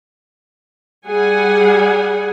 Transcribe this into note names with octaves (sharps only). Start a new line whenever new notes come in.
G3 G#4 F#5 G#5